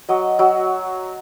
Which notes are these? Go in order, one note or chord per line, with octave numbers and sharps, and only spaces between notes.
F#3 D#5
F#3